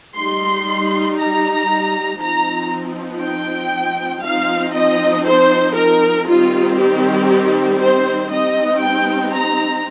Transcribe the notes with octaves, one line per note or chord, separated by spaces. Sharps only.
G3 D#4 C6
A#5
F3 C4 D#4 A#5
G5
F3 C4 D#4 F5
D#5
C5
A#4
D#3 G3 C4 D#4 F4
G4
C5
G3 C4 D#4 D#5
G5
A#5